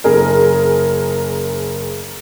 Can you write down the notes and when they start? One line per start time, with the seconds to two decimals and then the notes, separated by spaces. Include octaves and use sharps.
0.04 F#1 G#4 A#4